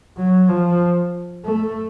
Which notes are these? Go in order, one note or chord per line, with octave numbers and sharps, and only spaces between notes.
F#3
F3
A3